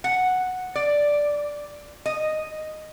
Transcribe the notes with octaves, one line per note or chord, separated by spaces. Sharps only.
F#5
D5
D#5